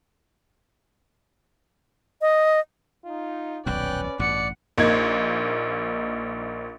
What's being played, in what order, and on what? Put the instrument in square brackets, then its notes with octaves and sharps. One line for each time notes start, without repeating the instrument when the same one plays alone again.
[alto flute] D#5
[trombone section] D#4 F4
[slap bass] D#1 B1 F2 [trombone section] C#4 B4 [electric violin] D5 [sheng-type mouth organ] G5 F#6
[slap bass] A1 G2 [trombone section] B2 [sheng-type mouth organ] D5 [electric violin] F#5 C#7
[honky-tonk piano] A#1 A#3 D#4 G#6